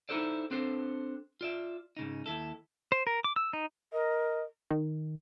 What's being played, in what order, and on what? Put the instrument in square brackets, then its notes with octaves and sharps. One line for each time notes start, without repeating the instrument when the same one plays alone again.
[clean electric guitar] D#4 E4 F#4 A4 C5 D5
C4 D4 A4 C5
F4 D5 E5
G#2 C#3 D#4
D#2 E4 A4
[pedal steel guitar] C5
A#4
D6
E6
D#4
[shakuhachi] A#4 [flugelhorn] D#5
[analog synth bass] D#3